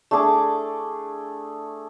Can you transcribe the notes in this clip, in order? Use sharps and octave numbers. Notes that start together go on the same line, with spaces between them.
A3 D4 G#4 D6